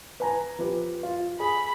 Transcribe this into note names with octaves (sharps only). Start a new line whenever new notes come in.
B4 G#5 A#5
F3 G4 B4
F4
G#4 B5